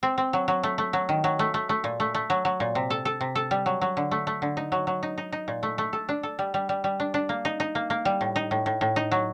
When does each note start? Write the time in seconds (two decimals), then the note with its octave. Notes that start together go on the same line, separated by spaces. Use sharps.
0.03 C4
0.18 C4
0.33 F#3
0.48 F#3
0.63 A3
0.78 A3
0.93 F#3
1.09 D#3
1.24 F#3
1.39 A3
1.54 A3
1.69 A3
1.84 A#2
2.00 A3
2.14 A3
2.30 F#3
2.45 F#3
2.60 A#2
2.75 C3
2.90 A4
3.05 A4
3.21 C3
3.35 A4
3.51 G3
3.66 F#3
3.81 F#3
3.97 D3
4.11 A3
4.27 A3
4.42 D3
4.57 D#4
4.72 F#3
4.87 F#3
5.03 D#4
5.18 D#4
5.32 D#4
5.48 A#2
5.63 A3
5.78 A3
5.93 A4
6.09 D4
6.23 A4
6.39 G3
6.54 G3
6.69 G3
6.84 G3
7.00 D4
7.14 D4
7.29 A#3
7.45 D#4
7.60 D#4
7.75 A#3
7.90 A#3
8.05 G3
8.21 A2
8.36 D#4
8.51 A2
8.66 A2
8.81 A2
8.96 D#4
9.11 F#3